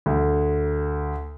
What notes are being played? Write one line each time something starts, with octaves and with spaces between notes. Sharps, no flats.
D2